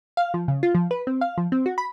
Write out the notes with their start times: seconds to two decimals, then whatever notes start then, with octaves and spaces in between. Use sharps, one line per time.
0.17 F5
0.34 F3
0.48 C#3
0.63 F4
0.75 F3
0.91 B4
1.07 C4
1.21 F5
1.38 F3
1.52 C4
1.66 F#4
1.78 B5